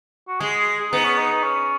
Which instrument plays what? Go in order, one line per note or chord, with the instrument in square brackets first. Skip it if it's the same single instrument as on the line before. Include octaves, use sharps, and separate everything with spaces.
[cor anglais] F#4
[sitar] G#3 [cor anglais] G#4
[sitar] B3 [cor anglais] D#4
[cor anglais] C#4
D#4
C#4